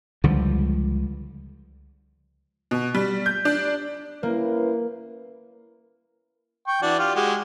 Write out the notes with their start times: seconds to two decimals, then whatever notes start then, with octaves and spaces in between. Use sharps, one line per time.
0.24 C#2 D3 F3 G3
2.71 B2
2.95 G3
3.26 G6
3.45 D4
4.23 A#3 C#4 E4 B4
6.67 G5 C#6
6.82 E3 D4 F#4
6.99 F4 G4
7.15 G#3 F#4 G4